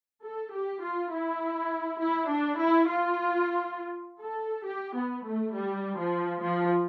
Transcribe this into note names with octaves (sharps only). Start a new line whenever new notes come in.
A4
G4
F4
E4
E4
D4
E4
F4
A4
G4
B3
A3
G3
F3
F3